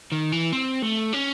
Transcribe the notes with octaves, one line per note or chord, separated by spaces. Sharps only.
D#3
E3
C4
A3
C#4